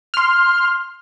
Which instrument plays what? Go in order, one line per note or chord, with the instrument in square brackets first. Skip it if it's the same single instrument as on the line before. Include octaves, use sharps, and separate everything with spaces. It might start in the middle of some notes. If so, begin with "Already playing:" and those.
[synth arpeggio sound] C6 F6